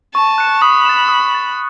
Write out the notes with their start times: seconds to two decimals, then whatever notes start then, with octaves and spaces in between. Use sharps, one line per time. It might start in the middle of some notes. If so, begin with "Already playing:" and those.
0.14 A5 C#6
0.38 F#6 C#7 E7
0.61 B5 D#6
0.85 A6 E7
1.08 D#6
1.32 A6 E7